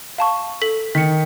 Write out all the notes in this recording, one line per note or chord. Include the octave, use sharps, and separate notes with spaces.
F5 A5 C#6
A4 B6 F#7
D#3 B6 C#7